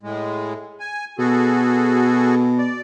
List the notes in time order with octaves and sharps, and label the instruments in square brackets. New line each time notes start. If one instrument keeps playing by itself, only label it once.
[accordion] A2 G#3
G#5
[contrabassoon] B2 [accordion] F#4 G#4 A4
[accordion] D5